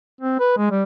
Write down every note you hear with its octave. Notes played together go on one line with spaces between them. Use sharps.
C4
B4
G#3
G3